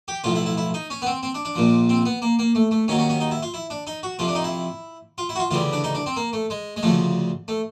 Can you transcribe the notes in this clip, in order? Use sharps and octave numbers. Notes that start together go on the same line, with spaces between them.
G4
B1 A2 F3 F4
E4
E4
E4
D#4
C#4
B3
C4
C4
D4
D4
A#1 A#2 F3
C4
B3
A#3
A#3
A3
A3
D#2 D#3 F#3 C#4
C#4
C#4
D#4
E4
F4
E4
D4
D#4
F#4
F2 C3 F3 F4
D4
D#4
E4
F4
E4
F#4
F4
D2 C#3 E3 G3 F4
D4
D#4
D4
C4
A#3
A3
G#3
G#3
D2 C#3 F3 A3
A3